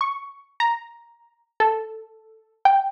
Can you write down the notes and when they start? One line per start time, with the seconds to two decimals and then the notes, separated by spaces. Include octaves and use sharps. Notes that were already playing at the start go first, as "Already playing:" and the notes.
0.01 C#6
0.60 A#5
1.60 A4
2.65 G5